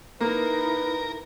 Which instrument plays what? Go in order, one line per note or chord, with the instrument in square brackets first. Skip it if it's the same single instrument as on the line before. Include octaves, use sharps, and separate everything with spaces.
[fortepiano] A#3 [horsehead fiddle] D#4 E4 [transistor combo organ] A#4 [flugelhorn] B4